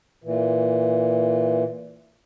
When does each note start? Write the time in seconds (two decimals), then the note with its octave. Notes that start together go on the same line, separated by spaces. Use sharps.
0.24 A#2 E3